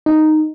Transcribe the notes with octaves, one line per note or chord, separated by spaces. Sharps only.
D#4